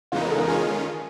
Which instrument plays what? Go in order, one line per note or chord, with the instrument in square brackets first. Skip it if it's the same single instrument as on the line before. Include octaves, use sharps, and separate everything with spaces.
[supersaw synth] C#3 E3 G#3 B3 D#4 [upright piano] F4
[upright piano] A#4
A4
A#4
[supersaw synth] D#3 G#3 C#4 F4 [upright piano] G#4